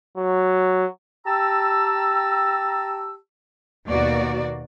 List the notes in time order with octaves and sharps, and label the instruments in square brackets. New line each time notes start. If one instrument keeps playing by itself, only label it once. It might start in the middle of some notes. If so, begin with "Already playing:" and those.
[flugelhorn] F#3
[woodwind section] G4 A5 A#5 E6
[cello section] D#2 B2 A#3 F#4 D5